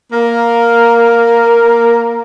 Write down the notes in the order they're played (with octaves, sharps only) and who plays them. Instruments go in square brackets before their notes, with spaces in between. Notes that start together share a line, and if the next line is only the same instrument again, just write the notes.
[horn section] A#3 A#4